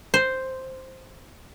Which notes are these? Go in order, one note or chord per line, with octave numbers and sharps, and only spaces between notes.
C5